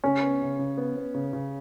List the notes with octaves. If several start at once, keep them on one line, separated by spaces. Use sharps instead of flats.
C#3 C#4
B3
C#3
C#3
B3
B3
C#3
C#3